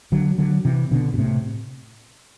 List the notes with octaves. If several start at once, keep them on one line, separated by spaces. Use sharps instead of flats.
D3 F#3
D3 F#3
C3 E3
B2 D3
B2
A2 C3